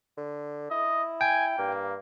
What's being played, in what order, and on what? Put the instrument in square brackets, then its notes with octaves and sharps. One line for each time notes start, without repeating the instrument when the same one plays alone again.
[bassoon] D3
[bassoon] E4 [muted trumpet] D#5
[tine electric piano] G5 [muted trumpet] G#5
[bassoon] G2 [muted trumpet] A#3